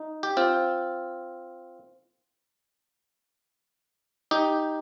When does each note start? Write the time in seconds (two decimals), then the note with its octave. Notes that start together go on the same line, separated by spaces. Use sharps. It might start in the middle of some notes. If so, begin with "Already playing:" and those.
Already playing: D#4
0.23 G4
0.37 C4 F4
4.31 D#4 G4